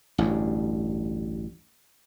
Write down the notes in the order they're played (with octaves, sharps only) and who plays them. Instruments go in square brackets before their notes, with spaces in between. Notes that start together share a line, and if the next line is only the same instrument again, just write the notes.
[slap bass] A1 D2 G2